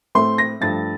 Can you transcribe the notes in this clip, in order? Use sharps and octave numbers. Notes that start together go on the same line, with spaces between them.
A2 A3 C4 C6
A#6
G2 F3 A3 A6